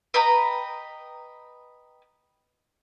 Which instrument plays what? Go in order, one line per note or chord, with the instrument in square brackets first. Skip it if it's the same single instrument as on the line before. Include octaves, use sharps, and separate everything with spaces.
[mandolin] B4 D#5 G5 A#5